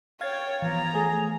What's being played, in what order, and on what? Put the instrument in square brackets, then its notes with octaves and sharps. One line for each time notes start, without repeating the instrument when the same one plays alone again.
[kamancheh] C#5 G5 [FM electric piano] F5 G#6 A6
[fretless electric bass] E3 F3 B3 [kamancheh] A#5
[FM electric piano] A3 [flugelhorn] G#4